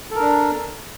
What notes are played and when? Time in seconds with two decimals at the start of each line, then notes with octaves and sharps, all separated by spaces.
0.11 A4
0.16 A#4
0.21 D4